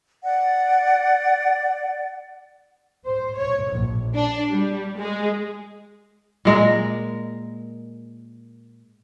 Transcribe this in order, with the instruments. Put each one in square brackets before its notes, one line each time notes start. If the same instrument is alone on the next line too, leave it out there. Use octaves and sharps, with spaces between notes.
[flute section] D5 F#5
[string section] C5
C#5
A#1
D4
G3
G#3
[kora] A#2 G#3 A#4